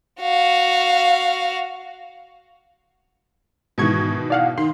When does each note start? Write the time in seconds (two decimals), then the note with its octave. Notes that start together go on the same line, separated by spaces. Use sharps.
0.20 F#4 F5
3.78 G#2 B2 D#3 E3 C#6 G#6
4.30 D5 F5 F#5
4.58 D#3 C6